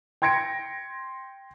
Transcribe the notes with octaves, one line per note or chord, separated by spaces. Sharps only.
G5 C6 G#6 A#6 C#7 D7